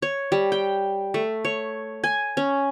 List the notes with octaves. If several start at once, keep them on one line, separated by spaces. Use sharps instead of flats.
C#5
G3
G5
A3
C#5
G#5
C#4